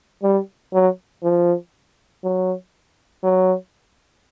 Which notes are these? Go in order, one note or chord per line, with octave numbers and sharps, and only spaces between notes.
G3
F#3
F3
F#3
F#3